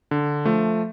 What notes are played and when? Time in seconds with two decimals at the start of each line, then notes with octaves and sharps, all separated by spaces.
0.11 D3
0.45 F3 A3